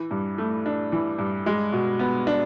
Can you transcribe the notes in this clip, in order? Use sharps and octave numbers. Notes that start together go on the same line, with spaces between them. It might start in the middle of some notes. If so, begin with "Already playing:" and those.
Already playing: E3
G2
A3
D4
E3
G2
G#3
B2
B3
D4